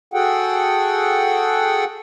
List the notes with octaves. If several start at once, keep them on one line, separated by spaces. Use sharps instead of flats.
F#4 G#4 A4 F#5 G5